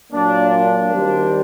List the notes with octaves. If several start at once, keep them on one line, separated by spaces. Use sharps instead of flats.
A#2 F#3 A#3 D4
D4
D#3 G3 C4